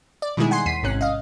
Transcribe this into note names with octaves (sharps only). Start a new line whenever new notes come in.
D5
B2 D#3 G3 G#3 E4 G#4
F#5 G#5 C6 C7
D#2 B6 C7 D#7
A1 G#2 C3 C#4 F#6
D#5 F5